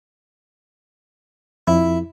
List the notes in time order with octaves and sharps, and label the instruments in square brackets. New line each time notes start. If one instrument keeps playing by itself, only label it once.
[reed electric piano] F2 [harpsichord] E4